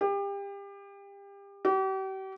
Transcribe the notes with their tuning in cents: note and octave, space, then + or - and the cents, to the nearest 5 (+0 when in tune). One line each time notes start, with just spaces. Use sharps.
G4 +30
G4 -40